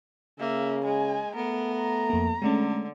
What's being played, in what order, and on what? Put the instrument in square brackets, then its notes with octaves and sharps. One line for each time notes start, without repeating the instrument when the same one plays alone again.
[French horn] C#3 [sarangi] A#3 [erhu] E5
[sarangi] G#3 [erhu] G#5
[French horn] A3 [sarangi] B3 [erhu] A#4
[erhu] A#5
[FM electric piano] F2 A#3
[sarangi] D3 [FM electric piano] G#3 A3 C#4